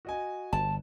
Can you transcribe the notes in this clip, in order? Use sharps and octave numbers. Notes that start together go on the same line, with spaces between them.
F#4 D#5 G#5
G1 A5